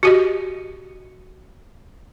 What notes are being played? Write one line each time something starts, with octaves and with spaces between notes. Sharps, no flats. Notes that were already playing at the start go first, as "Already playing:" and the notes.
F#4 G4 D#5